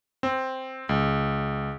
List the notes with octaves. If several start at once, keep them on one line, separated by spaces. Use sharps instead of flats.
C4
C#2